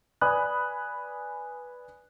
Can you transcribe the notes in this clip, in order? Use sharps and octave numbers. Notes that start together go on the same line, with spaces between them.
B4 D5 G#5 B5 D#6 F#6